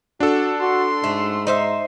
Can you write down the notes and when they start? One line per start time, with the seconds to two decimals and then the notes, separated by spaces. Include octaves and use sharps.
0.20 D4 F#4 A4
0.60 F#4 C6
1.04 G#2 A3
1.47 D#4 C5 E5